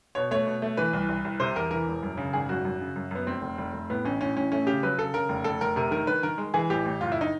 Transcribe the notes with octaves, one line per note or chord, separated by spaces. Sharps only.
B2 C#5
A3 C#5
B2
A3
E3 B4
C2
C2
C2
C3 C5
E2 A#4
E3 A#4
E1
F#2
C#3
G#1 G#4
F#2 F#4
F#2
C#3
F#2
F#2 B3
F1 C4
F1
F1
F1
A2 B3
A1 C#4
A2 C#4
A1 C#4
A3 C#4
C#3 G4
F#3 B4
C#3 A4
C#3 A#4
F1
F1 A4
F1 A#4
C3 A#4
D#3 A#4
D#3 B4
D#3 A#4
G#3
E3 G#4
A1 G4
A1
F#1 F4
E4
D#4